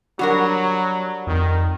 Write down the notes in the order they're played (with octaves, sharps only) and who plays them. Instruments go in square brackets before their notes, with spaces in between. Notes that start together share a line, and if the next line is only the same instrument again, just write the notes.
[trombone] F#3 [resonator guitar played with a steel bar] G3 D4 A#4 [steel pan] F#4
[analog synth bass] F2 [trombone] D#3